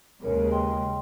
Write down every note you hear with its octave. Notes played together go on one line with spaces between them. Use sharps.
D#2 C#3 G#3 A#4 B4 C#5
D#5 G5 C6